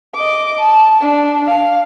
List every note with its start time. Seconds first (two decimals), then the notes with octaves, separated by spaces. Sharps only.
0.14 D#5 D6
0.60 A5
1.01 D4
1.46 F5